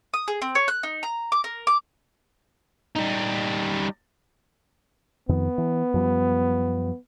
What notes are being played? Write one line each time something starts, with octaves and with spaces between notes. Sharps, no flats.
D#6
G#4
C4
C#5
F#6
D#4
A#5
D6
A#4
D6
G3 D#4
F2 D#3 B3
E3
F#2 F3 G3